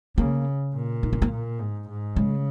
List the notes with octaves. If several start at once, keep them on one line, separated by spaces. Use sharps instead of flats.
C#3 A#3
A#2
D#4
C#4
A#3
A#2
G#2
G#2
C#3 G#3